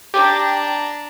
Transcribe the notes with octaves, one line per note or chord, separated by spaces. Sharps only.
D4 G4 A#5